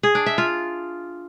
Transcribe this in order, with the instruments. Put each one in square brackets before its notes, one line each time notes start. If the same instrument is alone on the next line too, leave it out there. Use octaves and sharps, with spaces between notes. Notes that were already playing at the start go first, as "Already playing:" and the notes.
[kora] G#4
D4
E5
F4